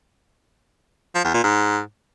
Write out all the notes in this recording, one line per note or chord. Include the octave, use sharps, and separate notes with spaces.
F3
E2
A#2
G#2